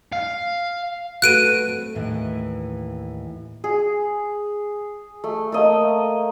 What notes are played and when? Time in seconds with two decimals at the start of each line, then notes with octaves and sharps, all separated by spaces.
0.13 F5
1.22 A3 F#4 B4 F#6 D7 D#7
1.67 A3 C4
1.95 D#2 A2 E3
3.64 G#4
5.24 A3
5.52 A3 A#3 D#5